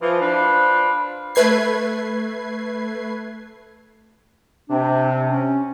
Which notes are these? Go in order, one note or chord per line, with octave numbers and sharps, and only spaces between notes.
E3 F3
D4 F4 B4 C5 F5
A3 B4 G#6 C7
C3 D4
C#4